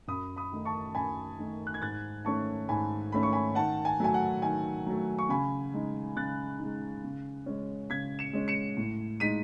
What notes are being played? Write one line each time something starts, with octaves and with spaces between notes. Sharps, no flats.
F#2 B5 D#6
B5 D#6
D#3 A3 D#4
A5 C#6
F#2 G#5 B5
D#3 A3 D#4
F#6
G#6
G#2 F#6 A6
D#3 A3 C#4 A5 C#6
G#2 G#5 B5
D#3 A3 C#4 B5
C#6
G#5 B5
D#3 F#5 A5
G#5
F#3 A3 G#5
F#5
D#3 G#5
F#3 A3
C#6
C#3 G#5 B5
G#3 D#4
C#3 F#6 A6
D#4
G#3
C#3
G#3 C#4
C#3 G#6 B6
C#7 E7
G#3 C#4
C#7 E7
A2
G#3 D#4 B6 D#7